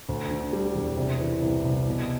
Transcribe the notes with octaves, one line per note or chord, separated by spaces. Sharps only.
D2
D3
G3
E1
C3
E3
C2
C2
B2